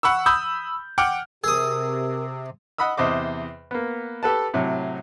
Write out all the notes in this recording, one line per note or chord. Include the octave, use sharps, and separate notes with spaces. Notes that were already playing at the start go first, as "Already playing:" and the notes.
F#5 B5 C#6 E6
B5 D#6 E6 G6
F#5 G5 D6 F6 F#6
C3 G#4 A#4 D#6 E6
D#5 F#5 B5 D#6 E6
E2 C3 C5 D#5 D6
A#3 B3
G4 A4 B4 A5
A2 C3 F#3